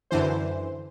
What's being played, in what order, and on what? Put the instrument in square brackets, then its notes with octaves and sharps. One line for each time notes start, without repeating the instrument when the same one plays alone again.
[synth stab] F#2 D3 E3 C5